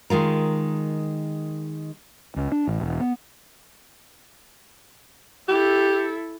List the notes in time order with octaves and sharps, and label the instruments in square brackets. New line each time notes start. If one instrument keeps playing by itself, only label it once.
[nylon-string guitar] D#3 G#3 F4 A#4
[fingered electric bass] C#2
D4
A1
E1
B3
[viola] E4 A4 [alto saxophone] G4